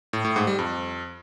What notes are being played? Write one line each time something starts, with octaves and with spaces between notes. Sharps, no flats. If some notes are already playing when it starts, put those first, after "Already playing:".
A2
A2
G#2
G3
F2